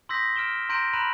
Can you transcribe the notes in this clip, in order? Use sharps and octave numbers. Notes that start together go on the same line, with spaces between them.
C6 D#6 E6 G6 A#6 B6
F6 D7 E7 G7
A#5 C6 G6 A#6 D7 D#7
A#5 B5 F#6 D#7 F#7